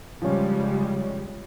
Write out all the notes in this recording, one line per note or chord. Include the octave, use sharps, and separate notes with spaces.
C#3 F3 G3 G#3 C#4